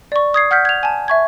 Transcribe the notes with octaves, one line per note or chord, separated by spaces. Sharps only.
D5 C#6
D#6 G#6 C7
F#5 F6 G6 B6
G#6 F7
G#5 A5
E5 C#6 G#6